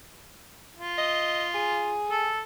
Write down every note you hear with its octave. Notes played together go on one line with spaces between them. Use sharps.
F4
D#5
G#4
A4